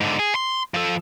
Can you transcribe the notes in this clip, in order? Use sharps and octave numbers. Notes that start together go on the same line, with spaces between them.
G#2 D3
G#4
C6
F3 A4